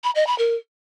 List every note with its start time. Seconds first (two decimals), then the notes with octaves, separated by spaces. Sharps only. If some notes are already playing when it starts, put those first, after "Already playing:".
0.04 B5
0.15 D#5
0.27 B5
0.38 A#4